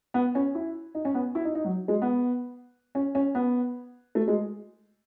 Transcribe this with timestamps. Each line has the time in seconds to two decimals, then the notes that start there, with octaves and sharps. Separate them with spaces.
0.14 B3
0.35 C#4
0.55 E4
0.95 D#4
1.05 C#4
1.14 B3
1.35 E4
1.45 D#4
1.55 D#4
1.65 F#3
1.88 G#3
2.02 B3
2.95 C#4
3.15 C#4
3.35 B3
4.15 A3
4.28 G#3